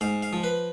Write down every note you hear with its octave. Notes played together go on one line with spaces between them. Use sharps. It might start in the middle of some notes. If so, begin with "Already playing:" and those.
G#2 F5
F5
F3
B4